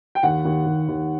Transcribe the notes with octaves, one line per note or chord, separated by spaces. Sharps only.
G5
D#2 F#5
D#2
D#2
D#2